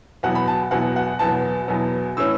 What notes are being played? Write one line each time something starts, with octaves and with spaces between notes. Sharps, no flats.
E2 B2 F#3 B3 F#5
B5
A5
E2 B2 F#3 B3 F#5
F#5
E2 B2 F#3 B3 A5
E2 B2 F#3 B3
A2 E3 C#4 E6